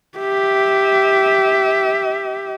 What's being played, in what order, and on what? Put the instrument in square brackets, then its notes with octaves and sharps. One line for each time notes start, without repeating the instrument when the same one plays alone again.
[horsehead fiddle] G4 E5